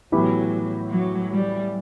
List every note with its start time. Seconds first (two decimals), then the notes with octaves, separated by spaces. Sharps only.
0.12 A2 E3 F#3 B3 E4 G4
0.92 F#3
1.33 G3